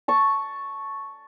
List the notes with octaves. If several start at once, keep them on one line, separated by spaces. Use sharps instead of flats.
A5 C#6